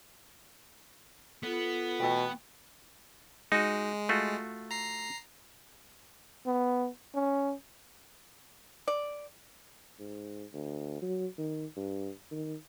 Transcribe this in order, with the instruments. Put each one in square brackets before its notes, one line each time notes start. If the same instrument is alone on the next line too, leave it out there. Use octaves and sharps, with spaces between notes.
[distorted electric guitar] B3 [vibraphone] F4 A4
[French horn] B2 [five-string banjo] E3 A3 G5
[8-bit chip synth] G#3 [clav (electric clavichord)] D#4 F#4
[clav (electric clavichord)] A3 F4 F#4
[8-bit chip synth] A#5 C7
[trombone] B3
C#4
[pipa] D5
[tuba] G#2
D2
F#3
D#3
G2
D#3